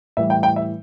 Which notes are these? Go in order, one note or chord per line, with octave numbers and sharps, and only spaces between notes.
A2 E3 G3 E5
G5
G5
E5